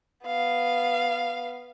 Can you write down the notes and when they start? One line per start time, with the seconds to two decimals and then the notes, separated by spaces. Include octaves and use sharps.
0.24 B3 F5